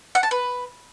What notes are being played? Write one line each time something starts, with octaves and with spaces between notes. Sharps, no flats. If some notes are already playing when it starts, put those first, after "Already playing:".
F#5
A5
B4